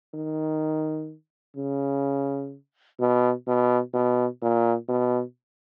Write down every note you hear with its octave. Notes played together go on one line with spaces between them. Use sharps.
D#3
C#3
B2
B2
B2
A#2
B2